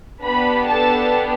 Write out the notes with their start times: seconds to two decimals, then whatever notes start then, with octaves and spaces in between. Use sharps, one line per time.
0.23 B3 D4 G4 B4 B5
0.68 A4 A5